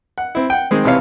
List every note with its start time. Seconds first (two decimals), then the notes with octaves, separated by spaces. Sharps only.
0.18 F#5
0.35 C4 E4
0.50 F#5 G5
0.71 D#3 G#3 C4
0.84 G#1 C3 E3 E4 C#5 F5